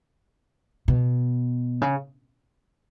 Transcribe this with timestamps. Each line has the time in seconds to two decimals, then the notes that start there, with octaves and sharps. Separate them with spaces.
0.88 B2
1.82 C#3